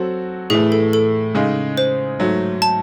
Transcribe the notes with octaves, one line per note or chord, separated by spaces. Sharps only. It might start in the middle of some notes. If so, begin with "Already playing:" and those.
Already playing: F#3 C4 F#4 A4
A2 E3 A3 G#4
A4
A4
C#3 G#3 D#4
C5
G#2 F#3 A3
A5